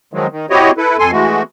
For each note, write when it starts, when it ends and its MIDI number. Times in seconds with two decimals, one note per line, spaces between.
0.13 0.27 51
0.13 0.27 53
0.13 0.27 54
0.13 0.27 56
0.31 0.46 51
0.50 0.71 60
0.50 0.71 64
0.50 0.71 66
0.50 0.71 67
0.50 0.71 73
0.50 0.71 75
0.78 0.97 64
0.78 0.97 69
0.78 0.97 71
0.99 1.11 41
0.99 1.11 69
0.99 1.11 80
0.99 1.11 84
1.12 1.42 52
1.12 1.42 56
1.12 1.42 57
1.12 1.42 66